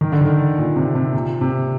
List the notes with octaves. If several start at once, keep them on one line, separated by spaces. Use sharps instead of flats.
D#3
D3
D#3
A#2
C3
C3
A#2
C3